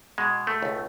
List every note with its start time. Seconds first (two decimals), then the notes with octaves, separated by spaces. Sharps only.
0.18 B2 G#3
0.47 A3
0.62 C#2